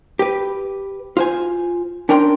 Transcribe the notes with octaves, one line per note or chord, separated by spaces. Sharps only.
G4 B4
F4 C5 G#5
C#4 D4 A#4 G5 C6